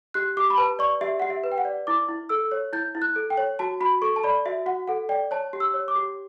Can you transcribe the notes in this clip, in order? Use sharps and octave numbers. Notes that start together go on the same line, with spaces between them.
G4 F#6
G4 D6
B5
B4 A5
D5 C#6
G4 E5
G4 F#5
E5
B4
G5
F#5
D5
E4 D6
E4
A4 E6
C#5
E4 G6
E4
F#6
A4
G5
C#5
F#4 A5
F#4 B5
A4 C#6
A5
D5 B5
F#4 E5
F#4 F#5
A4 F#5
D5 G5
C#5 A5
G4
E6
C#5
D6
G4